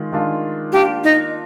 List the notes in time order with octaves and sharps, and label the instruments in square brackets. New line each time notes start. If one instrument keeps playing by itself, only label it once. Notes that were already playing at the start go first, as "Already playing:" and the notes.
Already playing: [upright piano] D#3 G#3 F4
D#3 G#3 D4 F4
[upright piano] A#3 D4 F4 [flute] G4
[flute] D#4